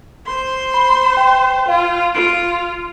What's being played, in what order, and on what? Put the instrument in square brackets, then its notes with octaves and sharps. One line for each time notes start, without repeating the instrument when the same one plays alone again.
[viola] C5 C6
[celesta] B5
G5
[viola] F4 [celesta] F5
[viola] F4 [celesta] C7 D7